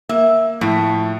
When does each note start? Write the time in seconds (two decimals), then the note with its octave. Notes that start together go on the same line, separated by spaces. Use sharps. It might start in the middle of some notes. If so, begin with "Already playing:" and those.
0.09 A#3 E5
0.61 A2 F3 A3